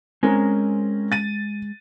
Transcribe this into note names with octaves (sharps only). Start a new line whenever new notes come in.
G#3 C4 C#4 A#4 G#5
A6 D#7